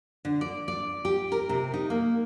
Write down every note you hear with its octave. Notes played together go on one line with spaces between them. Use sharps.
D3
D5
D5
G4
A#4
C3
D#4
A#3